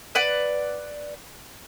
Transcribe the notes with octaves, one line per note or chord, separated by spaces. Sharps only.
B4 D5 F#5